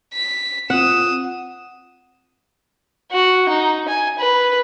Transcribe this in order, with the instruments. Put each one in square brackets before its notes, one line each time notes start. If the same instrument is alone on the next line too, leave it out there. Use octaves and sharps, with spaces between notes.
[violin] B6
[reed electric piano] C4 F4 [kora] F#5 [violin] D#6 E7
[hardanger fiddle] F#4
D#4
G#5
B4